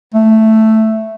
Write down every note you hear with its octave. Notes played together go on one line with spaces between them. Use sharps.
A3